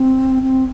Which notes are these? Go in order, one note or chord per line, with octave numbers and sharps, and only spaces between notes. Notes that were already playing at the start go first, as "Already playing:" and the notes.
Already playing: C4
C4